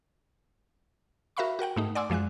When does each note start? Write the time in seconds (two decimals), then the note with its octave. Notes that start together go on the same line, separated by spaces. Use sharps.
1.37 F#4 A#4 E5 F5 B5 C#6
1.59 F#4 A#4 F#5 G5
1.76 G#2 A3 D#4
1.95 D5 F#5 G#5 C6 D6 E6
2.10 F#2 F3 G#3 G#5 F#6